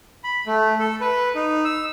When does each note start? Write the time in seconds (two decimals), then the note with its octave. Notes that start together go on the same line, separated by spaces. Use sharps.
0.24 B5
0.46 A3
0.80 A4
1.01 B4
1.35 D#4
1.65 E6